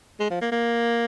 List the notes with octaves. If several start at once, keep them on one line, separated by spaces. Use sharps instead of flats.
G#3
F3
A#3
A#3